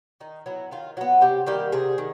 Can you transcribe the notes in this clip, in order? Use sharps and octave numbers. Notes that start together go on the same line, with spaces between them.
D#3 D#4
F#3 B3 E4
D#3 F4
F#3 B3 F#4
C3 G4
D#3 G3 A#3 G4
C3 G#4
D#3